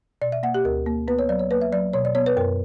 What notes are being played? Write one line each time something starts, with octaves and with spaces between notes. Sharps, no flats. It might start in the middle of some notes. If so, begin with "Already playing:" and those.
B2 D5
E5
A#3 F#5
G4
D2 A#4
A#3
B3 B4
C#5
F#3 D5
C#5
A#3 B4
E5
F#3 D5
B2 C#5
D5
B3 C#5
B4
F#2 A#4